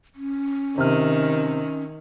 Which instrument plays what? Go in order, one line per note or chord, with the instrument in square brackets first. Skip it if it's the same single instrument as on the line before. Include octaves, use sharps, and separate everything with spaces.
[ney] C#4
[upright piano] C3 F6 [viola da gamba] D#3